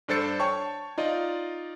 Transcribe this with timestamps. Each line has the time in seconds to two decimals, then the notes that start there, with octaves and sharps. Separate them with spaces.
0.08 G2 D4 A4 C5 A6 C#7
0.40 C#5 G5 A5 C#6
0.98 D#4 F4 D5 D#5